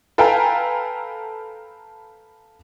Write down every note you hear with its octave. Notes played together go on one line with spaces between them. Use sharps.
A4 B4 F5 G5 G#5 A#5